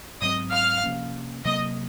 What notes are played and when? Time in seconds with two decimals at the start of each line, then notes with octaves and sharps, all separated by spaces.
0.21 G#2 F#3 C4 D#5 D#6
0.52 F5 F6
0.83 C3 F3 A#3 C#4
1.45 C3 F#3 A#3 D#5 D#6